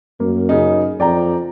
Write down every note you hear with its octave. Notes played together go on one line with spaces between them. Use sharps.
F#2 A#3
C#3 D#4
F2 D5 G5 A#5